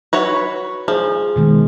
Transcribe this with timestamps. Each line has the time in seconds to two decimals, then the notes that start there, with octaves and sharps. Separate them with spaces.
0.13 F#4 B4 C#5
0.88 F3 G#4
1.36 B2 D#3 G#3